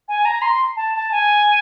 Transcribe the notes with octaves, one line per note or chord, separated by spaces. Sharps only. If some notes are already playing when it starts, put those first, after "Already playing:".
G#5
A#5
C6
A5
A5
G#5